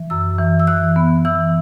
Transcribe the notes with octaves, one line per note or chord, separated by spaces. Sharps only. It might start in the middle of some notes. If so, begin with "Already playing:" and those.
Already playing: E3
F#2 E6
E3
E6
E3 F#6
B3
E3 E6